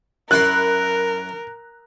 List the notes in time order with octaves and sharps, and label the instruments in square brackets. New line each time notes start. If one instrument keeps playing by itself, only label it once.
[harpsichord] F#2 E4 C6 [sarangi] A#4 [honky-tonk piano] F#6